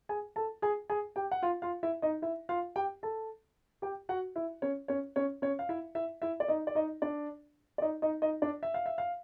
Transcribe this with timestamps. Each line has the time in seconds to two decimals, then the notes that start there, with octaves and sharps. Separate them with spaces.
0.09 G#4 G#5
0.36 A4 A5
0.62 G#4 G#5
0.90 G#4 G#5
1.16 G4 G5
1.31 F#5
1.43 F4 F5
1.62 F4 F5
1.83 E4 E5
2.02 D#4 D#5
2.22 E4 E5
2.49 F4 F5
2.76 G4 G5
3.03 A4 A5
3.82 G4 G5
4.09 F#4 F#5
4.36 E4 E5
4.62 C#4 C#5
4.88 C#4 C#5
5.16 C#4 C#5
5.42 C#4 C#5
5.59 F5
5.69 E4 E5
5.95 E4 E5
6.22 E4 E5
6.40 D5
6.48 D#4 D#5
6.67 D5
6.75 D#4 D#5
7.02 D4 D5
7.78 D5
7.82 D#4 D#5
8.02 D#4 D#5
8.22 D#4 D#5
8.42 D4 D5
8.63 E5
8.74 F5
8.86 E5
8.98 F5